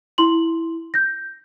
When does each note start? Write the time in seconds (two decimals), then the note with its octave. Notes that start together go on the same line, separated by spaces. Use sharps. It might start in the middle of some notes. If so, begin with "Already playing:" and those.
0.18 E4 C6 F#7
0.94 G6 A#6